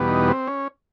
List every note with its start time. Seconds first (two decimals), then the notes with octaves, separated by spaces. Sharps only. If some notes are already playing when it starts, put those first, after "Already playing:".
Already playing: E2 B2 G3 B3
0.08 D#4
0.28 C4
0.47 C#4